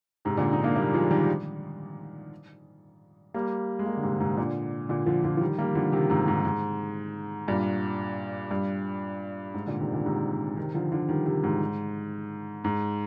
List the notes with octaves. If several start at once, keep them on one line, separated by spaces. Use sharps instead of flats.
G#2 C3
A#2 D3
D#4
A#3 D4
G3 A#3
F3 G#3
D#3 G3
G3 A#3
G#3
G3 A#3
D3
G#2 C3
D3
G#2 C3
A#2 D3
A#2 D3
D3 F3
D3 F3
F3
D#3 G3
G3 A#3
D3 F3
C3 D#3
G#2 C3
G#2
G#2
G2 A#2
G2
G#2
A#2 D3
C3 D#3
A#2 D3
G#2 C3
C3 D#3
D3 F3
D3 F3
D#3 G3
C3 D#3
G#2
G#2